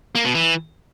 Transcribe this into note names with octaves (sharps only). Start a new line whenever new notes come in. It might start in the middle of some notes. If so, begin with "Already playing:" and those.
A#3
B2
E3